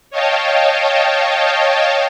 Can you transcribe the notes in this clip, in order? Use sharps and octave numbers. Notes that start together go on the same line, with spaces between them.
C#5 D#5 F5 G5 A5